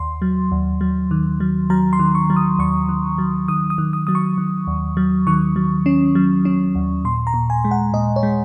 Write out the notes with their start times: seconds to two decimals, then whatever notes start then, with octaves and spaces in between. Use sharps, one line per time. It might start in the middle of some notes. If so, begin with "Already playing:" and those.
Already playing: D#2 C6
0.22 F#3
0.51 D#2
0.81 F#3
1.11 D#3
1.40 F#3
1.70 F#3 A#5
1.93 C6
1.99 D#3
2.15 C#6
2.30 F#3
2.36 D#6
2.59 D#2 C#6
2.89 D#3
3.18 F#3
3.48 D#3 D#6
3.70 D#6
3.78 D#3
3.93 D#6
4.07 F#3 D#6
4.15 C#6
4.38 D#3
4.67 D#2
4.97 F#3
5.27 D#3 C#6
5.56 F#3
5.86 C#4
6.15 F#3
6.45 C#4
6.75 D#2
7.05 A#2 C6
7.27 A#5
7.34 A#2
7.50 G#5
7.65 G#3
7.71 F#5
7.93 A#2 D#5
8.16 C#5
8.23 G#3